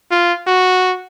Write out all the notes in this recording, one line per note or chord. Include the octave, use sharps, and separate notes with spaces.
F4
F#4